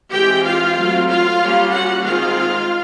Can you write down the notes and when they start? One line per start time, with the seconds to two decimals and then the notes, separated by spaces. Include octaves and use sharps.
0.11 E3 G#3 C4 G4 G5
0.44 F4 F5
0.76 F#3 A3 C4
1.09 F4 F5
1.41 G3 A#3 C#4
1.72 F#4 F#5
2.04 D#3 G#3 C4 F4 F5